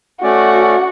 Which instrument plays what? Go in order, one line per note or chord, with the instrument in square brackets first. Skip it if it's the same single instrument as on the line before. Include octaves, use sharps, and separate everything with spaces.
[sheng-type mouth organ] A3 C#4 D5 [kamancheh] F#4